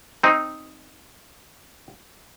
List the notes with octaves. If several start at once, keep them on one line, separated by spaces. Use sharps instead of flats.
C4 D#4